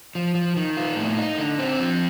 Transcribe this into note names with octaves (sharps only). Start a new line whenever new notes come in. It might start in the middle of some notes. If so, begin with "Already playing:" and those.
F3
F3
D#3
F4
A2
D#4
D3
C4
F3